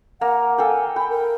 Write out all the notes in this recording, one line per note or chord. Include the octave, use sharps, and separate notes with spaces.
A#3 F#5 A#5
A4 F5 G5 G#5
G5 B5
A#4